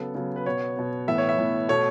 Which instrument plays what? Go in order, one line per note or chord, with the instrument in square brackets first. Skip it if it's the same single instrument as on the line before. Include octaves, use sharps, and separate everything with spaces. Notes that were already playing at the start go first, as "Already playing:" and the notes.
Already playing: [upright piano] C#3 F#3 B3 A4
C#3 F#3 B3
B4
B2 B3 C#5
B2 B3
A2 E3 B3 E5
C#5
E5
A2 E3 B3
B2 A3 C#5